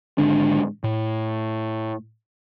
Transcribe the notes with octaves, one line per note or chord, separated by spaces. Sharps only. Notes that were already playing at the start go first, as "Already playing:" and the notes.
G#1 G#2 D3 D4
A2